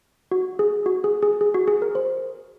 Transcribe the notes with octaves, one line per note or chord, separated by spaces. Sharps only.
F#4
G#4
F#4
G#4
G#4
G#4
F#4
G#4
A#4
C5